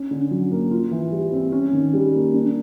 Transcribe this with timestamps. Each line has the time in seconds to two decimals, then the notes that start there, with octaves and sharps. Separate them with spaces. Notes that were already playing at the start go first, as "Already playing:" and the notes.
Already playing: C#4
0.11 D3
0.31 F#3
0.51 A#3
0.71 F4
0.91 E3
1.12 G3
1.32 C4
1.52 C#4
1.73 D#3
1.93 G3
2.14 A#3
2.34 D4